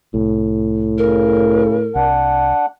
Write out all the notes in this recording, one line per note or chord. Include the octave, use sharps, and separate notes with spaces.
C2 A2
C#3 A#4
C2 D4 F#5